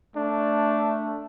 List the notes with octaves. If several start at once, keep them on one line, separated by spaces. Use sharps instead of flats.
A3 D4